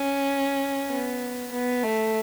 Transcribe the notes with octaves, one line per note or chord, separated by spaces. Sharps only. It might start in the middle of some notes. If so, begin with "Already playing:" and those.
Already playing: C#4
B3
B3
A3